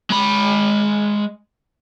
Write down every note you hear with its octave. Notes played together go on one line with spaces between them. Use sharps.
G#3 B5